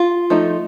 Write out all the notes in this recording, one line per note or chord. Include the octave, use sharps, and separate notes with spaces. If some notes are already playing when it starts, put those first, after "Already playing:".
Already playing: F4
F3 A3 D#4